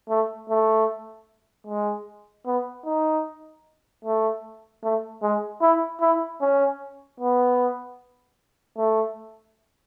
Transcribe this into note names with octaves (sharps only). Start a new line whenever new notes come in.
A3
A3
G#3
B3
D#4
A3
A3
G#3
E4
E4
C#4
B3
A3